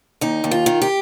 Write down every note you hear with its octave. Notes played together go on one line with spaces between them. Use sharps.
D#2 D#4
D#2
F4
D#3
G4